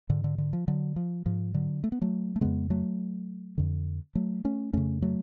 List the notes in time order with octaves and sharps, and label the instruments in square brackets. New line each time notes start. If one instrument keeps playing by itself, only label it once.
[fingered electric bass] G#2 D3
D3
D3
F3
D3 F#3
F3
G#2 F3
D3 F#3
A3
B3
F#3 A3
A3
F2 C#3 G#3 B3
F#3 A3
F2 D3
F#3 A3
A3 C#4
F2 C#3 A3 C#4
F#3 A3